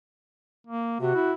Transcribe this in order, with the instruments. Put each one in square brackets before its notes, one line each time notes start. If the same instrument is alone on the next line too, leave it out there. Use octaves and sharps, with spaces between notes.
[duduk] A#3
[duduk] C3 [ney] F#4
[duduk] E4